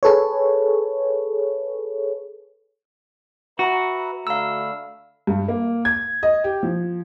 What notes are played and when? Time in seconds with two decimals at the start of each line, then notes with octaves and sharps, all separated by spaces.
0.03 G#4 A4 B4 C#5
3.59 F#4 B4 E5 A#5
4.27 D3 A3 F5 B5 E6
5.27 G2
5.48 A#3
5.85 G#6
6.23 D#5
6.44 G4
6.63 F3